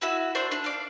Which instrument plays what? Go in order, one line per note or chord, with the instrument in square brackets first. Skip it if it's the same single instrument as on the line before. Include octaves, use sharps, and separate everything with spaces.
[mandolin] E4 F#4 E5
D4 C5 C#6
D4
D5 F5